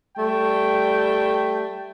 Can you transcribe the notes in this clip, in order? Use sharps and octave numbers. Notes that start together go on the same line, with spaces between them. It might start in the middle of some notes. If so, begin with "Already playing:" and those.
G3 A3 G5